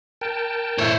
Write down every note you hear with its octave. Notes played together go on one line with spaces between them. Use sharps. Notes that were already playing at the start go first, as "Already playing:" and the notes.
A#4 G5 A5
A2 C5 C#5 E5